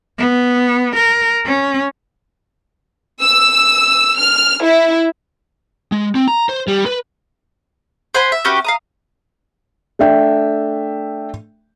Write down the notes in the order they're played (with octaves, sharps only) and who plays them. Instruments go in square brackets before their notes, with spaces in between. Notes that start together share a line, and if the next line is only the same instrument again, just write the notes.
[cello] B3
A#4
C#4
[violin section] E6
F6
E4
[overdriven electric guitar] G#3
C4
A#5
C5
G3
B4
[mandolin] C5 F#5 G#5 B5
E5
C#4 F#4 G4 B4
F5 A#5 D#6
[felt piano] A3 D4 E5 G5